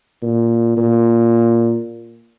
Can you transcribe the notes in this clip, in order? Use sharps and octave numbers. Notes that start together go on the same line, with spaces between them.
A#2
A#2